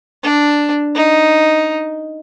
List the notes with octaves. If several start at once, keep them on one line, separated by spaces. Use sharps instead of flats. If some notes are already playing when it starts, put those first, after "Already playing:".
D4
D#4